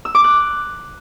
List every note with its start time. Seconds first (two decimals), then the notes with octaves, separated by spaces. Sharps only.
0.05 E6
0.15 D6
0.24 F#6